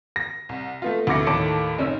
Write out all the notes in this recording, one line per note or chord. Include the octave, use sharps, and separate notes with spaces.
A#6
C2
A3 B3 F4
D2 B2 E4 D6 A#6 C#7
D#2 A2 C#5 A5 D6 D7
F#1 C#4 D#4 E6